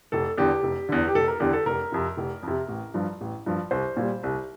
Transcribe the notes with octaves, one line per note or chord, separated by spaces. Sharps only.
F1 A4
E2 D3 G4
F1
E2 D3
G4
F1 A4
A#4
E2 D3 G4
A4
F1 A#4
F2 C3
F1
F2 C3
A1
G2 F3
A1
G2 F3
C2 C5
A#2 G3
C2